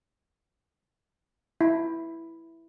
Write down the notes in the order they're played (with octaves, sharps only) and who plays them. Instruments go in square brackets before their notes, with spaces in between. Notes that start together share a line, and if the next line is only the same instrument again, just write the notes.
[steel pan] E4